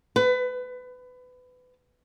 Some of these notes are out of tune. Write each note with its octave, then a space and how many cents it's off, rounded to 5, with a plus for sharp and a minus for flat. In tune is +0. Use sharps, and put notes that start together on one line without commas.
B4 +25